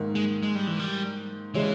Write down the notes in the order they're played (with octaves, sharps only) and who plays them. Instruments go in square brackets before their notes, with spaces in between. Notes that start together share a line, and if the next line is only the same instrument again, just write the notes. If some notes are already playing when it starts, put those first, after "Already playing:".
Already playing: [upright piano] G#2 D#3 A#3
[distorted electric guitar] G#3
G#3
G3
E3
G3
[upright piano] C#3 G#3 C#4 E4 [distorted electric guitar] E3